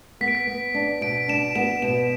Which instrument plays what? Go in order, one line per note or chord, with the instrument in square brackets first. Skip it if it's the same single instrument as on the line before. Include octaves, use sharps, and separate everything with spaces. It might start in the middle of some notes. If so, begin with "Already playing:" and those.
[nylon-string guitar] B3 [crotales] B6
[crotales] D7
B6
[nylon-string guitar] B3
D4
[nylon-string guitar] B2 [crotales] D7
[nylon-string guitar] D4 [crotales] E7
[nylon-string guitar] B3 [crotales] E7
[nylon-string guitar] B2 [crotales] E7